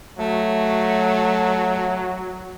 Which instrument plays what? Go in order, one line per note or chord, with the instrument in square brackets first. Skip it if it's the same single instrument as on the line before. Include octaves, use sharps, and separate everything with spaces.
[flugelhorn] F#3 [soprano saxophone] A3